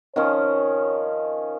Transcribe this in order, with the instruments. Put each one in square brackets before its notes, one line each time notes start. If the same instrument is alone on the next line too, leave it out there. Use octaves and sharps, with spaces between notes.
[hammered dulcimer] D#3 F3 C#4 [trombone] C#5